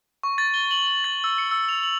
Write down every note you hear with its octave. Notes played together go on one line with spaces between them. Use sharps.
C#6
A6
G7
F#7
F#7
A6
E6
C#7
E6
F7
F#7